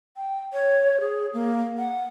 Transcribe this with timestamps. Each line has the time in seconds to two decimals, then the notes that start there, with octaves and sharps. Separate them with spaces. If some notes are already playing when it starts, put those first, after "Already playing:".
0.17 G5
0.53 C#5
1.01 G#4
1.34 A#3
1.78 F#5